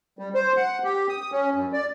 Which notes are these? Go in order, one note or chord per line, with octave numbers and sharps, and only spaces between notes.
G3
C5
F#5
G4
D#6
C#4
F#2
D5